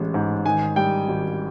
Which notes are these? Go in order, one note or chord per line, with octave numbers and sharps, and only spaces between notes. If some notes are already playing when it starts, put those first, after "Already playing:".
Already playing: A1 G#3
G#2
D#3 G#5
G3 G5
G#1